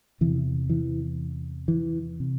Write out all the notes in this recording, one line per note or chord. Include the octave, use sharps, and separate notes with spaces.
E2 C3 E3
E3
E3
C3